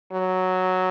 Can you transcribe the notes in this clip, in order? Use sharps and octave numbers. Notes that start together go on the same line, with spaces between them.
F#3